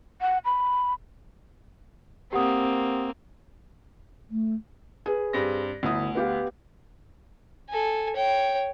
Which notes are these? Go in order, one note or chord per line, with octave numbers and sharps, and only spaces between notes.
F#5
B5
A#3 C4 G4 F#5 D#6
A3
G#4 B4
G2 C4 A#6
G1 D2 E4 D#6
B3 G4 F5
A4 G#5
C#5 G5